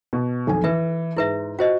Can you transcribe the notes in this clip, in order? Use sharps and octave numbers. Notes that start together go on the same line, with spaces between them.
B2
B1 F2 G#5
E3 B4 E5
G#2 E4 B4 E5
F4 F#4 C5 D#5